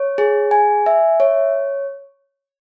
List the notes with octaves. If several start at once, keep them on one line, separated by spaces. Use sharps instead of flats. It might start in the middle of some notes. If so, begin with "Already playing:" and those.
Already playing: C#5
G#4
G#5
E5
C#5